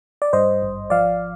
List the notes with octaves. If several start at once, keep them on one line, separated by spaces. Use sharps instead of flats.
D5
G2 C5 D#5
G#1
F3 D5 F5